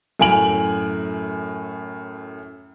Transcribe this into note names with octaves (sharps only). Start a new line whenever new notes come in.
F#2 A2 G#5 D7 F#7